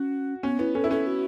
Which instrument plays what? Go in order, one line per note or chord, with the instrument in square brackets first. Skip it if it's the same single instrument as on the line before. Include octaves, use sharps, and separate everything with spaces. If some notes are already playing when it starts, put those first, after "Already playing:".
Already playing: [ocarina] C#4 [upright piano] F#4
[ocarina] B3 [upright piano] C#4
[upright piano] B3 [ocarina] E4
[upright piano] C#4 [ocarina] A4
[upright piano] E4
[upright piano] C#4 [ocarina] A4
[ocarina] F#4